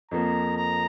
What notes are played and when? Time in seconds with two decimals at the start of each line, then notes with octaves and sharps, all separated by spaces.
0.11 F2 F3 A#3 A#5
0.57 A#5